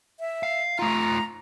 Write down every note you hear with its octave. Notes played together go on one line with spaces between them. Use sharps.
E5
F5
A3 F4 A#5